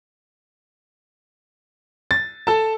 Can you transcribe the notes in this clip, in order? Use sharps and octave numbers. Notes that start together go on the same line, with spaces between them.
A6
A4 A5